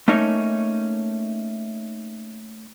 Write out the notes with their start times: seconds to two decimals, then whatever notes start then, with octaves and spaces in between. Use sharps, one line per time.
0.08 A3 A#3 C#4 D#4 C#5